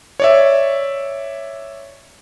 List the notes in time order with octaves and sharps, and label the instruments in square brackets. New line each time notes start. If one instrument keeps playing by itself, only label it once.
[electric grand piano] C#5 D5 E5